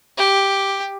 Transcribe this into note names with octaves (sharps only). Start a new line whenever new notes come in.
G4